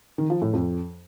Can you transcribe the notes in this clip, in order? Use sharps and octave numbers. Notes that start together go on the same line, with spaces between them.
D#3
F3
A2
F2